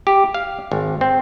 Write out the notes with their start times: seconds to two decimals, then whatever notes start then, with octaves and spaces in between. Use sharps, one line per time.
0.07 G4
0.34 F5
0.72 G#1
1.01 C4